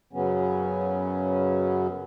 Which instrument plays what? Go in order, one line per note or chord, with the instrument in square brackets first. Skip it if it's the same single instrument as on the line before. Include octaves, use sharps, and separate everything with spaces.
[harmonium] F#2 C#3 F#3 B3 C#4